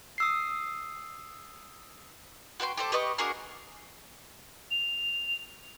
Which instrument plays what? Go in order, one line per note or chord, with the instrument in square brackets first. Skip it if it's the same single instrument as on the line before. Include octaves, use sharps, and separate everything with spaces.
[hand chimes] D#6 E6 C7
[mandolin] F#4 B4 G5 C6
G4 A4 C5
G4 B4 D#5 C#6
D4 F#4 G#4 A#4
[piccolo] F7